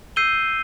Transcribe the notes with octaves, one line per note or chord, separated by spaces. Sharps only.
E6 G6 C7 D#7 G7